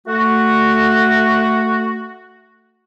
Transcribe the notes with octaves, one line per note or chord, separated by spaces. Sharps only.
A3 F#4